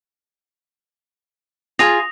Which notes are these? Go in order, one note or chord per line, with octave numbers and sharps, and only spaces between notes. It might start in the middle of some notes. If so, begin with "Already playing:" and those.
F4 G#4 D#6 A#6 F7